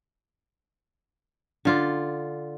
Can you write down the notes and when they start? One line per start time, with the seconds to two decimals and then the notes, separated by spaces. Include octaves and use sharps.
1.65 D3 F4 D5